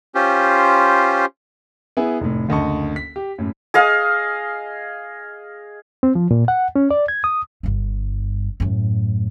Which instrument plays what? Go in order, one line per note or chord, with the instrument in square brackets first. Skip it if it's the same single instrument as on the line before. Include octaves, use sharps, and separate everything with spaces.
[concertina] C#4 F4 G4 C5
[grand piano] B3 E4 G#4
F1 A2
F#1 D2 D#5 A5 C#6
B6
G4
F#2 A2
[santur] G#4 D#5 F5
[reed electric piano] C4
F3
A#2
F#5
C#4
D5
G#6
D#6
[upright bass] G1 G2
F#2 A2